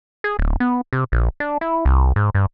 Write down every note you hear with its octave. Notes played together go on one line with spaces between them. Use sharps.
G#4
D1
B3
C3
A#1
D4
E4
C2
G#2
G2